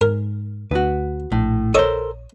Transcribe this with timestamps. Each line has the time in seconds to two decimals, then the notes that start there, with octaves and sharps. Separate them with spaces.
0.01 G#2 A#4
0.71 D2 F#4 B4
1.32 A#1 A2
1.74 A4 A#4 C5 C#5 D#5 D#6